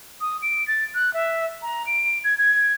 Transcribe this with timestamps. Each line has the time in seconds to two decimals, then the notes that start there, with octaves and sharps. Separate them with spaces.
0.21 D#6
0.42 D7
0.68 A6
0.95 F#6
1.14 E5
1.62 A#5
1.87 D7
2.24 G#6
2.38 G#6